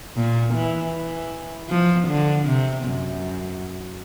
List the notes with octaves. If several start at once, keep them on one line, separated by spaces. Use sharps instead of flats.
A#2
E3
E3
F3
D3
C3
F#2